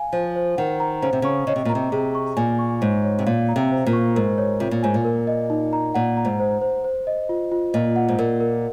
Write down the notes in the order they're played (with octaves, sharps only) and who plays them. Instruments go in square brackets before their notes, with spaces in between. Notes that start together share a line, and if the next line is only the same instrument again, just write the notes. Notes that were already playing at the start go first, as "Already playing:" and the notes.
Already playing: [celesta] F5 G#5
[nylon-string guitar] F3 [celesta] C5
[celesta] C5
[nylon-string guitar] D#3 [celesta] F#5
[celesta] A#5
[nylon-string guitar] C#3 [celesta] C5
[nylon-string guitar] C3
[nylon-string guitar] C#3 [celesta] C#6
[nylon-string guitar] C#3 [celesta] D#5
[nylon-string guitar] C3
A#2
[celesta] A#5
[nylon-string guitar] C3
[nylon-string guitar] C3 [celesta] G#4
[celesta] C#6
[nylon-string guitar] A#2 [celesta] G#5
[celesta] C#6
[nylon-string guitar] G#2 [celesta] C#5
[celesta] C#5
[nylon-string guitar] C3
[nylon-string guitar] A#2 [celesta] F5
[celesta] A#5
[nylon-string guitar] C3
[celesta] C5
[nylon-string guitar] A#2
[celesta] C#6
[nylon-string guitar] G#2 [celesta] A#4
[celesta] C#5
[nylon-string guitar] C3 [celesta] F4
[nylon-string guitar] A#2
[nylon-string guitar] G#2 [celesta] G#5
[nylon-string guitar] A#2
[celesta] A#4
D#5
D#4
A#5
[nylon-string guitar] A#2 [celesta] F#5
[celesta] A#5
[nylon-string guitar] G#2
[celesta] C5
C5
C5
D#5
F4
F4
[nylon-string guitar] A#2 [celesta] D#5
[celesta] F#5
[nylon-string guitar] G#2
[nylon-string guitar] A#2 [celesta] A#4
[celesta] A#4